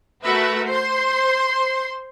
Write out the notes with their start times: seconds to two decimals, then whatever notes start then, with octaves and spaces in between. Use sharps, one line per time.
0.23 A3 F#4 A#4 B4 E5
0.67 C5 C6